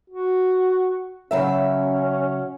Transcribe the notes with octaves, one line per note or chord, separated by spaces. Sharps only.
F#4
C#3 F#3 C#4 E5